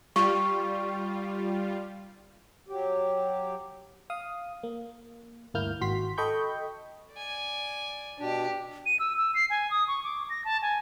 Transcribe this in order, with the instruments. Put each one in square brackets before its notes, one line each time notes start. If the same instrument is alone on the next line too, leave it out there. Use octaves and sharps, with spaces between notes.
[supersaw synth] G3 F4 [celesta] C#6
[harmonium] F#3 G4
[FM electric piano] F5 D#6
A#3
G1 D2 A#3 E4 F6 G6
G#1 F#4 C6 B6
A4 D#5 G5 B5 C#6 G6
[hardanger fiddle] D5 G#5
[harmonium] B2 D4 [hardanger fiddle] G4
[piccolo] D#7
E6
E6
C7
G#5
D#6
C#6
D6
A#6
A5
G#5